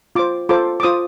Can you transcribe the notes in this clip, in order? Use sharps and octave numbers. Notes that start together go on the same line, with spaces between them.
F4 C5 D6
F4 A4 C5 D6
D6
F4 C5 D#6